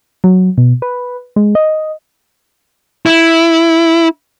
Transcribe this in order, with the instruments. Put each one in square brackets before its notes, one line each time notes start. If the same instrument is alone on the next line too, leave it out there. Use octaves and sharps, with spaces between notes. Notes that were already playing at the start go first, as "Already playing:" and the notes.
[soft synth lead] F#3
B2
B4
G#3
D#5
[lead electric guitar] E4